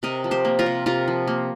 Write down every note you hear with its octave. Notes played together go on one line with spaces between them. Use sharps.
C3 A#4 D#5
F3
G4 C5
A#3
F4 A#4
C3
C3 F4 A#4
F3
A#3